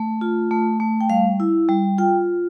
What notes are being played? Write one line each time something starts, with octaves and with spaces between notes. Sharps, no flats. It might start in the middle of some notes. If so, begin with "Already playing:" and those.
Already playing: A3
F4
A3
A3
G5
G3 F5
E4
G3
F4 G5